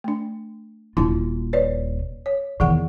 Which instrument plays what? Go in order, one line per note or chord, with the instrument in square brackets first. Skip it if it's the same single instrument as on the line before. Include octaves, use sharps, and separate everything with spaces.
[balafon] A3 D4
[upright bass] D#1 F4 [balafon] A#3 D4 E4
[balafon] B4 C#5 D5
C#5
[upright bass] E2 D#3 [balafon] E3 G#4 F#5